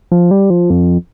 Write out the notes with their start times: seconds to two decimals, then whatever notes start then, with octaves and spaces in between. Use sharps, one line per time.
0.12 F3
0.31 G3
0.50 F3
0.70 F2